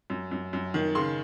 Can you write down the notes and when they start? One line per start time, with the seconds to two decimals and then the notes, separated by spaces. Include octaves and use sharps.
0.10 F#2
0.31 F#2
0.53 F#2
0.74 D#3
0.95 C#3 C6